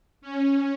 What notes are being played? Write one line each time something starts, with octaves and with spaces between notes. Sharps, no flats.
C#4